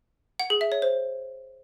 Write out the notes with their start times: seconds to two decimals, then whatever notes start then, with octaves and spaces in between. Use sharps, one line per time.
0.40 F#5
0.50 G#4
0.61 E5
0.72 C#5
0.82 C5